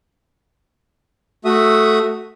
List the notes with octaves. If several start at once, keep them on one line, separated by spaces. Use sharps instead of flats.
A3 F#4 E5 D#6